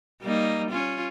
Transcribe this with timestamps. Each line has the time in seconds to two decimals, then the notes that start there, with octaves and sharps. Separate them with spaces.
0.22 G3 A#3 D#4
0.70 C#4 F4